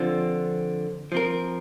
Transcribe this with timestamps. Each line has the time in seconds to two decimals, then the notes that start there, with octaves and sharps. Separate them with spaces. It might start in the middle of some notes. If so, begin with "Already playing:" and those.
Already playing: D3 F3 C4 F4 C5
1.12 F3 C4 A#4